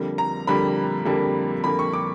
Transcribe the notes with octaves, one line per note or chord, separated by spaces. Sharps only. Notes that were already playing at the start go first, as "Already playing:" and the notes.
Already playing: F2 D3 G3 A#3
A#5
F2 D3 G3 A#3 B5
F2 D3 G3 A#3
F2 D3 G3 A#3 B5
C#6
D6